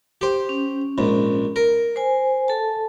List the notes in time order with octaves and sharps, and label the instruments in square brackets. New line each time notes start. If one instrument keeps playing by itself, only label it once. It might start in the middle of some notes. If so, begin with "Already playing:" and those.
[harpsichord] G4 C5
[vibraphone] C#4
[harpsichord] A#1 G#2
A#4
[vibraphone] C5 G#5
A4 A5